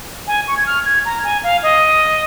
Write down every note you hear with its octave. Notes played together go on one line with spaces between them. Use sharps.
G#5
C#6
G#6
F6
G#6
A#5
G#5
F5
D#5